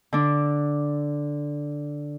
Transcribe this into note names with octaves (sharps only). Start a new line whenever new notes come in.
D3 D4